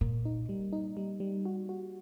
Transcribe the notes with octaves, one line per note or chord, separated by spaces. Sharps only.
A#2 A#3
D#4
G3
D#4
G3
G3
F#4
F#4